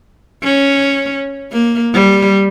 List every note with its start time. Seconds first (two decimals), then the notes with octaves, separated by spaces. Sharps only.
0.43 C#4
1.53 A#3
1.94 G3